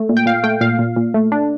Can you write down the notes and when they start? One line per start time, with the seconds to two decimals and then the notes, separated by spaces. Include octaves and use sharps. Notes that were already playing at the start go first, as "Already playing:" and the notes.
Already playing: A3
0.09 A#2
0.17 G5
0.26 A#2 F5
0.43 A3 G5
0.61 A#2 F5
0.79 A#2
0.96 A#2
1.14 A3
1.32 D4